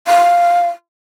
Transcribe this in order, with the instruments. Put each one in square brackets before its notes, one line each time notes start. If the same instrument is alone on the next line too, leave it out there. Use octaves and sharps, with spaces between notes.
[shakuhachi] F5